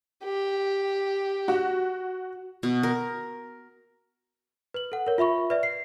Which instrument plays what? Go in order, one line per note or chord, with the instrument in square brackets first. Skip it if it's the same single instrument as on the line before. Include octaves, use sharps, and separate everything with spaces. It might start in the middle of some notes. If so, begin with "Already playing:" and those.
[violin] G4
[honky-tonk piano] F#4
[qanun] B2
A#4
[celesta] B4 F#7
A4 F#5
A#4 C#5
F4 E5 B5 C#6
B4 D5 E5
C7